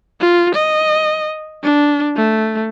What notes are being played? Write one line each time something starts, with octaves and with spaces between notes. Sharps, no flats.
F4
D#5
D4
A3